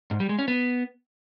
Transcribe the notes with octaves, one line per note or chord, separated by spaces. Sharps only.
G#2
G3
G#3
C#4
B3